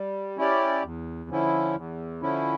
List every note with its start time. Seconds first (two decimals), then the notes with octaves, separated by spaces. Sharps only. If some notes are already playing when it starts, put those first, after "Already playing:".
Already playing: G3
0.37 C#4 E4 G4 D5
0.83 E2
1.30 D3 F3 C#4 E4
1.76 E2
2.21 D3 F3 C#4 E4